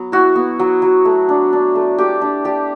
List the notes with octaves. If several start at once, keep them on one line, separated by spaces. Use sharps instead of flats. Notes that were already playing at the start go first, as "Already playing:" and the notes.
Already playing: F#3 B3
E4 F#4
B3
F#3
F#3
A3
D4
D4
A3
A3 G4
D4
D4 G4